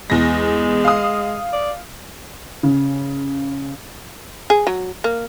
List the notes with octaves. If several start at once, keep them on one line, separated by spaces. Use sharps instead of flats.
E2 G#3 A#6
F5 D#6
D5
C#3
G#4
F#3
A#3